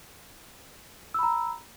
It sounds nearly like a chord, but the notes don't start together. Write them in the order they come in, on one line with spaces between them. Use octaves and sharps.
E6 B5 A#5